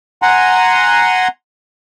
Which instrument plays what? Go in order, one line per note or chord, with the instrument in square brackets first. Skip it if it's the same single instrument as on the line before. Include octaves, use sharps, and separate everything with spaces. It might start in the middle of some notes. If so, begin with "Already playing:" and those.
[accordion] F#5 G#5 A#5 C6